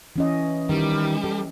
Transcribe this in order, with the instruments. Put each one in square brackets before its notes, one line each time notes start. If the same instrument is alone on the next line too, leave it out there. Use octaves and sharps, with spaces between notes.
[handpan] E3 C#4 D#5
[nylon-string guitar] D#3 [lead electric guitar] G3
[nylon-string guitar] A4